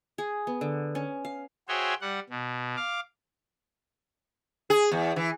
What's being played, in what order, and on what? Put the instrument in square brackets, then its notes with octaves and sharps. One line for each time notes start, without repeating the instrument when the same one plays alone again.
[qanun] G#4
B3
D3
C#4
F5
[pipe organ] F#4 G#4 C5 C#5 E5 G5
G3 F#5
B2
F5 D6
[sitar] G#4
E2
E3